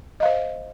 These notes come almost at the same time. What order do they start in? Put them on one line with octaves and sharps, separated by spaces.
D#5 F5 C5